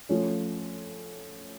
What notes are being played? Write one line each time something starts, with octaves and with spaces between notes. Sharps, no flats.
F3 A3 C#4